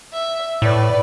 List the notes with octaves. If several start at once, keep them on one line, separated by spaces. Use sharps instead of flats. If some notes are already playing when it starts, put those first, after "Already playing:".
E5
A2 B4 D5